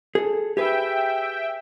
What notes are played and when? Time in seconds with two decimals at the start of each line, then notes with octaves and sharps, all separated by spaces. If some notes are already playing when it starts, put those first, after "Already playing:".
0.15 G#4 A4
0.57 G4 G#4 B4 E5 G5